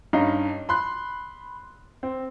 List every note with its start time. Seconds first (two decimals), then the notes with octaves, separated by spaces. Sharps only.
0.13 G2 C#4 D#4 F5 A#5
0.69 B5 C6 F#6
2.03 C4